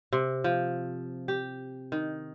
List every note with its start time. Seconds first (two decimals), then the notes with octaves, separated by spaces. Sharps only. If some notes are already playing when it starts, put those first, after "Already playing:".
0.13 C3
0.44 F3
1.28 G4
1.92 D#3